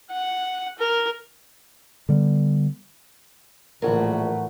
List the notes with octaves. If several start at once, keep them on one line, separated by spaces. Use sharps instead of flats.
F#5
A#4
D3 G3 B3
A#1 A2 E3 F#3 A3 F#4 A#4